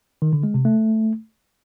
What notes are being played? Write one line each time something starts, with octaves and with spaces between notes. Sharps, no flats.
D#3
D3
G#3
C3
A3